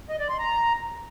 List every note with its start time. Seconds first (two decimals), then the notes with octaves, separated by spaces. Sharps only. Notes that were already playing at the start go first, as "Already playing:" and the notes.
0.09 D#5
0.19 D5
0.29 C6
0.39 A#5